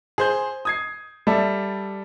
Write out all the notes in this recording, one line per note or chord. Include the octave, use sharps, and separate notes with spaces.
G#4 C5 G6
D#6 G#6 C7
G3 A4 D5 E5